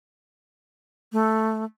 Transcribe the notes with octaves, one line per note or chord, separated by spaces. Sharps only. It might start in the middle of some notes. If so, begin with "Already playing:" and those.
A3